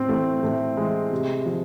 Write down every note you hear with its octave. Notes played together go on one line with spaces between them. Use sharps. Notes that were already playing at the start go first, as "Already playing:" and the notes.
Already playing: A2 C4
E3 A3
A2 A3
E3 G#3
C3
F3